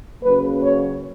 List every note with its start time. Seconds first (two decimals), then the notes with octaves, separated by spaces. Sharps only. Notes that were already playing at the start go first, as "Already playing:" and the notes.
0.22 C#3 F#3 A#3 B4
0.60 C#5